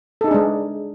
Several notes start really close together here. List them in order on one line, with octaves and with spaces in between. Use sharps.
A4 D#4 G#4 D4 G#3